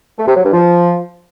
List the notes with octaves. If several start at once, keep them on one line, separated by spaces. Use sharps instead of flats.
A3
C3
F#3
G2
F3